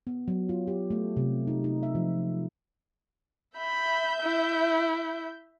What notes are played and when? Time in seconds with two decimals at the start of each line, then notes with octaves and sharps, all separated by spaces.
0.07 B3
0.28 F#3
0.49 F4
0.67 G4
0.90 A3
1.17 C3
1.47 D#4
1.64 D#4
1.83 E5
1.95 F3
3.57 E5 B5 G6
4.22 E4